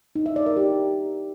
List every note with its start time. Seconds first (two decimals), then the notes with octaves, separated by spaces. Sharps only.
0.15 D#4
0.26 E5
0.36 D5
0.46 A#4
0.57 G4